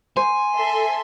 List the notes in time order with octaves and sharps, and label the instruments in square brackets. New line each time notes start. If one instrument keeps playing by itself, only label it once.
[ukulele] C5 [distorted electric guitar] G#5
[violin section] A4 E5 C6